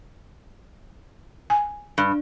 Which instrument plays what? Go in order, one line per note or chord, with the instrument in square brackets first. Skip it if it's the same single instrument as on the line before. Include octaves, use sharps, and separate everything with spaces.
[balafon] G#5
[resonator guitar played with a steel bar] G2